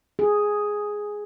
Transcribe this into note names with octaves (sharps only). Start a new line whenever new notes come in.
G#4